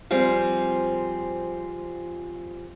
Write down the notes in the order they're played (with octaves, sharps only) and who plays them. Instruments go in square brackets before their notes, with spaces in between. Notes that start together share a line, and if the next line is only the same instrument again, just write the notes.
[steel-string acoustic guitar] F3 G3 C4 G#4